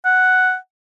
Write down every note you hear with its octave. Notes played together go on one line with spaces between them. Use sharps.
F#5